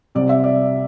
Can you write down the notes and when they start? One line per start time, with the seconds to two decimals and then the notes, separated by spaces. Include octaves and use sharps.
0.15 C2 C3 G3 C4 D5
0.29 E5
0.44 D5